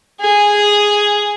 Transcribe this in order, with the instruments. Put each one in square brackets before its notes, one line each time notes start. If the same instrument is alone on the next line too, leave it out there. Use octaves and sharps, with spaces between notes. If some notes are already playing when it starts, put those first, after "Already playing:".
[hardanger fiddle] G#4